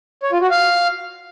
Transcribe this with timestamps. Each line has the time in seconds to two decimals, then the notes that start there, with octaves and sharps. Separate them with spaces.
0.23 C#5
0.32 F4
0.41 F#4
0.51 F5